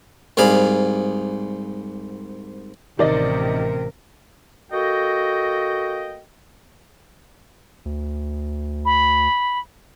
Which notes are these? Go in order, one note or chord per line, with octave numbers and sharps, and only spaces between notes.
C2 G#2 D5 F5 G#5 B5
A1 C3 D#3 A#4 D5 D#5
A#3 F#4 A4 D#5 G5
D2
B5